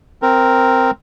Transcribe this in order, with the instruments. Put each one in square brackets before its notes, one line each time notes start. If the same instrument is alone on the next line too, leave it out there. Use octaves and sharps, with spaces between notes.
[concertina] C4 A#4